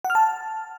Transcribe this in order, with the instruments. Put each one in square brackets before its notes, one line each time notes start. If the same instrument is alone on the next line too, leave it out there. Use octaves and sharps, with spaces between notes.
[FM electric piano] F#5
F6
A5